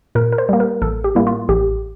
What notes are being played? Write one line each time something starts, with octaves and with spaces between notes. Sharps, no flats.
A#2 A#4
A#4
C5
G3 A#3
A#4
A1 A4
G4
A2 G3 A#3 E4
F4
A1 G4